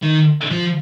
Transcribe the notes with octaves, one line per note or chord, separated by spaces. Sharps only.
D#3
F3